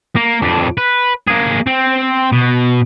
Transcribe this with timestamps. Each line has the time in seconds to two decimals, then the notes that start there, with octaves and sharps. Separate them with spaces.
0.16 A#3
0.42 F2 D4
0.78 B4
1.28 A#3 G#4
1.67 C4
2.32 B2